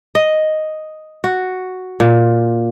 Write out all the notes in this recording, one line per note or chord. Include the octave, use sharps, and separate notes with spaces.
D#5
F#4
A#2